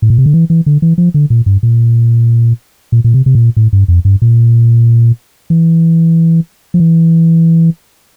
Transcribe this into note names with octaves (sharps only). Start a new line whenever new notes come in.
A2
A#2
C3
D3
E3
E3
D3
E3
F3
D3
A#2
G2
A#2
A#2
A#2
C3
C3
A#2
A2
G2
F2
G2
A#2
E3
F3
E3